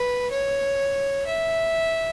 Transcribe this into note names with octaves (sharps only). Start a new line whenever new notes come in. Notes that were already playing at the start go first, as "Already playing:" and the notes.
Already playing: B4
C#5
E5